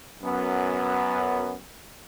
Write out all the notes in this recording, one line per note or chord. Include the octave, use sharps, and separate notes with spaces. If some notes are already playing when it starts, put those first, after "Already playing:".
F#2 B3